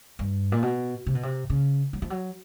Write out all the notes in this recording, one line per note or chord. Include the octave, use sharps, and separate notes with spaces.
G2
A#2
B2
C3
B2
C3
C#3
F#3
F3
F#3